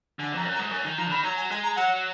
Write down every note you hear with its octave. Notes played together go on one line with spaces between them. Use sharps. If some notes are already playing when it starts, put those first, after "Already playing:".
D3 G#5
F2 A#5
F#2
A#5
G#2
F#2 G#5
D#3 G#5
F3 A#5
D3
D#3 B5
F#3 A#5
G#5
G#3 G#5
A#5
F#3 F#5